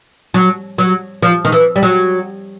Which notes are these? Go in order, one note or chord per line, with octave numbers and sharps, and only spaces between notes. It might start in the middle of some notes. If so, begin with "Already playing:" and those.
F#3
F#3
F3
D#3
E3
G3
F#3